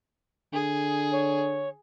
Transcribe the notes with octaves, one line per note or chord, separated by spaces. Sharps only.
D3 G#4
C#5